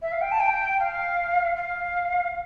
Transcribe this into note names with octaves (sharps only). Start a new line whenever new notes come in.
E5
F5
G5
A5
G5
F5
F5